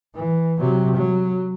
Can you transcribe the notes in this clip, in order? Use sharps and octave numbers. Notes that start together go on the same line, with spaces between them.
E3
C3 F#3
F#3